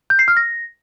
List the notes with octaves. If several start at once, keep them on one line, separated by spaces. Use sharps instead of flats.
G6
C7
F6
A#6